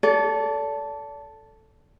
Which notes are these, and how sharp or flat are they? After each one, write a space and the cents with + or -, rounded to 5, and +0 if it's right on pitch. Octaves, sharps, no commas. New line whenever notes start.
A4 +0 D5 -35